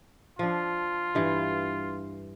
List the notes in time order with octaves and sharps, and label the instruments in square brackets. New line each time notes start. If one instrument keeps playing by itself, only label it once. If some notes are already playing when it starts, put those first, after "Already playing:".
[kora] F3 D4 [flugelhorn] F4
[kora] G2 E3